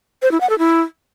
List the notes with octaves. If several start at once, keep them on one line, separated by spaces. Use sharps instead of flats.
C5
E4
F#5
A4
E4